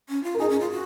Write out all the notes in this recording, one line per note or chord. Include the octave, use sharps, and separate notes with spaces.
C#4
F4
A#4
D#4 G#4
C#4
F4
F#4